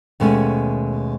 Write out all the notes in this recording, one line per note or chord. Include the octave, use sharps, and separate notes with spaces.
D#2 B2 G#3 A3 C#4